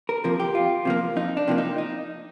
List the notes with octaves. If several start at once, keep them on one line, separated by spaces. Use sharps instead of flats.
A#4
C3 F3 A#3 A#4
G4
F2 F4
C3 F3 A#3
F2 D#4
D4
C3 F3 A#3
D#4
D#4